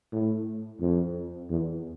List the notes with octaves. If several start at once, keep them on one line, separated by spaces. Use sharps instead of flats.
A2
F2
E2